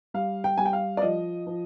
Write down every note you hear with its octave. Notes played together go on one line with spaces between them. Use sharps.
G3 F5
G5
G3 G#5
G5
F5
D5
F3 D#5
F3